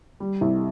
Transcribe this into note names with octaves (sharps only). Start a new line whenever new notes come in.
G3
C2